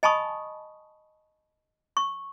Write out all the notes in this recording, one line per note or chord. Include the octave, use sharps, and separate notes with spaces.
D#5 G#5 A5 B5 C#6 D#6
C#6